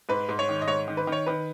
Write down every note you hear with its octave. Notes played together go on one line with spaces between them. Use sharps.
G#2 B4
G#2
C#5
D#3
D#5
G#2 C#5
D#3
B4
D#3
C#5
D#3 B4